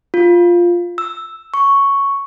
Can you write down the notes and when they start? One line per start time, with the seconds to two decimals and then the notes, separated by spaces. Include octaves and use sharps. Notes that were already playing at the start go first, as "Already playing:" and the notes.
0.14 F4
0.98 E6
1.54 C#6